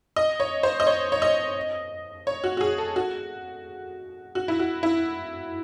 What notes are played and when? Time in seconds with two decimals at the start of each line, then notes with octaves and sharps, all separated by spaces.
0.16 D#5
0.40 C#5
0.63 C5
0.80 D#5
0.87 C#5
1.12 C#5
1.22 D#5
2.27 C#5
2.44 F#4
2.57 F#4
2.61 G#4
2.78 A4
2.96 F#4
4.35 F#4
4.48 E4
4.59 F#4
4.83 E4